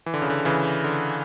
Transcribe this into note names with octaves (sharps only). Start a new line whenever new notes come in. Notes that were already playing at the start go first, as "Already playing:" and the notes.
E3
D3
C#3
D3
C#3 E3
D3